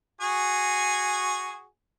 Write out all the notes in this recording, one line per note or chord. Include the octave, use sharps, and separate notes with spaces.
F#4 G#4 G#5